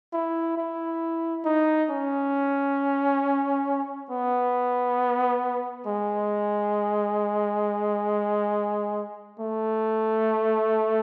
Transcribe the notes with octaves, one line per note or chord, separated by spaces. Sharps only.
E4
E4
D#4
C#4
B3
G#3
A3